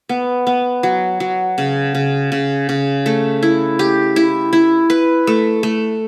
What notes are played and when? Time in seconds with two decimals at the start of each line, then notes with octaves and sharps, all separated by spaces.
0.09 B3
0.47 B3
0.83 F#3
1.20 F#3
1.58 C#3
1.95 C#3
2.32 C#3
2.69 C#3
3.06 A3
3.43 E4
3.79 G4
4.16 E4
4.53 E4
4.90 B4
5.27 A3
5.63 A3